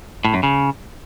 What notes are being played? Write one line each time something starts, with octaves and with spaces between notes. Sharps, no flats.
A2
F#2
C#3